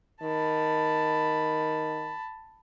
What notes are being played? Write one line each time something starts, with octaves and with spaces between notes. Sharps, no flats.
D#3 A5 B5